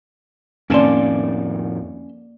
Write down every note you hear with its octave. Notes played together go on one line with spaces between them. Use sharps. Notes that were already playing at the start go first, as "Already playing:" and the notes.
F2 A2 D#3 A#3 C#4 D5 A5 C6